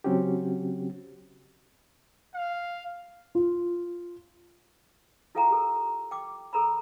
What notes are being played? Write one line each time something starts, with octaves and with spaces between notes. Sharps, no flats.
C#3 F#3 C4 C#4 F#4 G4
F5
F4
E4 F4 A4 F5 G5 A#5
G4 A4 A#4
G5 D6
A4 A#4 A#5 B5